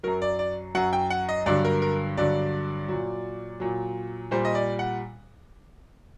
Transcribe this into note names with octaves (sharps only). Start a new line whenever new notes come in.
F#2 F#3 A#4
D5
D5
F#2 F#3 F#5
G5
F#5
D#5
G2 D3 F#3 D5
A#4
A#4
G2 D3 F#3 D5
A#2 F#3
A#2 F#3
A#2 G3 C5
D#5
D5
F#5